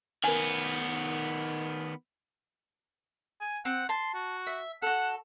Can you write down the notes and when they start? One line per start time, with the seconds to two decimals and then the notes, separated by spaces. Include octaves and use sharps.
0.24 D#3 B3 A#4 G#5
3.41 G#5
3.65 C4 F#5
3.89 A5 C6
4.14 F#4
4.47 E5
4.82 F#4 A4 F#5